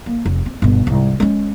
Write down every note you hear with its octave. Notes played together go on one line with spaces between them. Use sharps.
A#3
F1
C4
G1 B2
C2 G#2
G#3 C#4